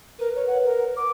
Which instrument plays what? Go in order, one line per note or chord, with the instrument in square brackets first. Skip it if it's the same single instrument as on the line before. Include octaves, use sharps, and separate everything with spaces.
[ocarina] A#4 [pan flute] B4
[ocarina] C#5
F#5
A#4
D6